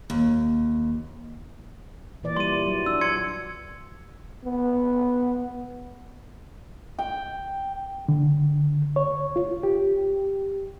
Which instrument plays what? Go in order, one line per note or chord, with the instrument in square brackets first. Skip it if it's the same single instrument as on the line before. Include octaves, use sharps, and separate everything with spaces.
[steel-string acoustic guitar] D#2
[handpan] A#2 E3 D5
[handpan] G3 D5 [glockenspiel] C6 D#7
[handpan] F#3
[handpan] D4 [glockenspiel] E6
[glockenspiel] C6 G#6 C#7
[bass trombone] B3
[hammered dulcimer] G5
[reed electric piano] D3
C#5
F4
G4